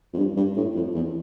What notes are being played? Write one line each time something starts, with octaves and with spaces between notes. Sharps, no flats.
F2
G2
G2
A2
F2
E2